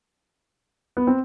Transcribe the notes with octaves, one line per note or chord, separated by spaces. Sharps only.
B3
C4